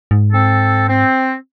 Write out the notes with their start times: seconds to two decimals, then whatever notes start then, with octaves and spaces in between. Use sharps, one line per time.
0.11 G#2
0.32 C4 A4
0.88 C4